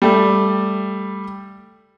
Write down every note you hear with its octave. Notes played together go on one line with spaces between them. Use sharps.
G3 A3